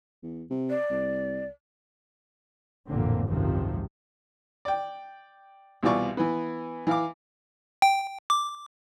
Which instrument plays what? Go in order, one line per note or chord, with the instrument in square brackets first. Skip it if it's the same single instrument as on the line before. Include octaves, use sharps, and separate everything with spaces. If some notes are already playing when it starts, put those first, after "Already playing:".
[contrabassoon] E2
C3
[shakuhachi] D5
[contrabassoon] C2
[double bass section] A1 F2 A#2 D3 A#3 C4
G#1 C#2 F#2 C3 D#3 F3
[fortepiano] D5 G5
C2 B2 E3 F4 D5 C#6
E3 B3
E3 F5 D6
[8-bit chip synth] G5
D6